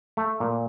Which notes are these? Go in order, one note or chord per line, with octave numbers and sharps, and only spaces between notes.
A3
A#2